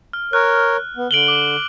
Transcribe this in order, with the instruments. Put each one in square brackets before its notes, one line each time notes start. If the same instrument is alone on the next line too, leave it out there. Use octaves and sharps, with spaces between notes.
[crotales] F6
[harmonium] A#4 C#5 [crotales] F#6
[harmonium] B3
[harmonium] D3 [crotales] D7 F#7 G7
[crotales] D6